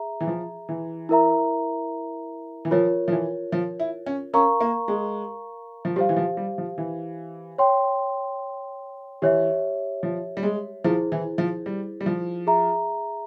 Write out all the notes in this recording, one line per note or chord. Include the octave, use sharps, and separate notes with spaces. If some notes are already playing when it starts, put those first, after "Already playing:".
Already playing: G#4 E5 A#5
E3
F3
E3
E4 A#4 E5 A#5
E3
F3 F4 A#4 C#5
F3
E3
F3
E4
C#4
C#4 A#4 F5 A#5 C#6
A#3
G#3
F3
G3 G4 C5 F5
E3
F3
G3
F3
E3
C#5 G5 C6
E3 G4 C#5 E5
F3
G3
G#3
F3 E4 G#4 C5
E3
F3
G3
G3
F3
G#4 E5 A#5